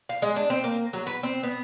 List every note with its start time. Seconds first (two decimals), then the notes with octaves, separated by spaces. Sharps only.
0.09 F5
0.22 G#3
0.36 D4
0.50 C4
0.64 A#3
0.93 F#3
1.07 B4
1.23 C4
1.43 B3